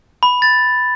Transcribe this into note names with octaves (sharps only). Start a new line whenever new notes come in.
B5
A6